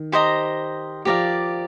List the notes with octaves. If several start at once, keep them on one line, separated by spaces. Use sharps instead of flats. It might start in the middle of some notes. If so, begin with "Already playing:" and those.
Already playing: D#3
G4 C5 D#5 A#5
F3 G4 A#4 D5 F5